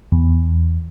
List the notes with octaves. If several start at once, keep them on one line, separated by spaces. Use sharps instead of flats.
E2